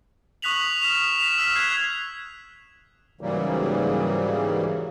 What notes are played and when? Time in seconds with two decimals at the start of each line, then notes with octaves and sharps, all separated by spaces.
0.42 C#6 D#6 F#6 B6 F7 F#7
0.82 D#6 F6 B6 E7 F7
1.18 B6 E7 F7
1.38 E6 F6 B6
1.55 F#6 G#6 B6 C7
3.21 G#2 C#3 E3 F#3 G3 A#3